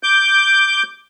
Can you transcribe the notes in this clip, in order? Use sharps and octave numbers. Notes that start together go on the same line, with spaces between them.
D6 G6